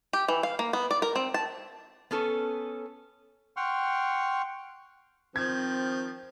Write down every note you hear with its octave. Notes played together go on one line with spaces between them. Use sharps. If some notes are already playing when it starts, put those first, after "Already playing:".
G4
E3
F5
A#3
B3
D5
A#4
C4
A5
B3 C#4 A4
F#5 G5 C6 C#6 F6
D#3 F3 C4 G#6